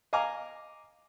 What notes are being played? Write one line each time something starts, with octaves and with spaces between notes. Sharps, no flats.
D#5 F5 G#5 A#5 D6